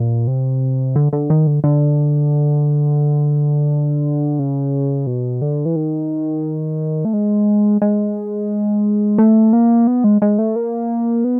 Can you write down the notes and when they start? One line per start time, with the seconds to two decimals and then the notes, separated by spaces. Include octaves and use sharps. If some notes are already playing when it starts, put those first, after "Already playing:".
Already playing: A#2
0.27 C3
0.96 D3
1.13 D3
1.30 D#3
1.47 D3
1.64 D3
4.39 C#3
5.07 B2
5.42 D3
5.65 E3
5.76 D#3
7.05 A3
7.13 G#3
7.82 G#3
9.18 A3
9.53 A#3
9.87 B3
10.04 G#3
10.22 G#3
10.39 A3
10.56 A#3
11.24 B3